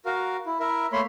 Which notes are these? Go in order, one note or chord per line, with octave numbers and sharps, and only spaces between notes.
F#4 A#4 F5
E4
E4 A#4 E5
A3 A#3 C#5 B5 C6